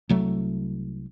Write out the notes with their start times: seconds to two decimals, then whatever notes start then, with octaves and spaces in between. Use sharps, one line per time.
0.09 C2 F#3 A3